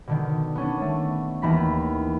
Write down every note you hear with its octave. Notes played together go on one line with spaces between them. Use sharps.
B2 D3 D#3
B3 C#4 D4
A3
D#2 E3 A#5 B5 B6